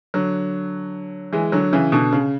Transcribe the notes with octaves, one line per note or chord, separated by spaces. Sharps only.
D3 F#3
E3 G#3
D3 F#3
C#3 E3
B2 D3
C#3